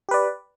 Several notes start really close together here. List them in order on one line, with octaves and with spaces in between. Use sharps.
G4 B4 D5